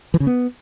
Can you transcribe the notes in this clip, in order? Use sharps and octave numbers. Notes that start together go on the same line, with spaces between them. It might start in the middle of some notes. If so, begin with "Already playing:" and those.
E3
C#3
B3